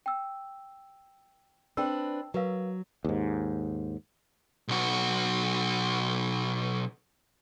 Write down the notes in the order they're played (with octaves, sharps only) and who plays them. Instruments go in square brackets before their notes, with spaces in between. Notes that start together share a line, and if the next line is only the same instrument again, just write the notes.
[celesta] G5 E6
[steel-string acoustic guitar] C4 D4 B4 [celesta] G5 E6
[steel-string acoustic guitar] F#3 [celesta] A#4 B4 F5
[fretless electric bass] D#2 G#2
[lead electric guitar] B1 F#4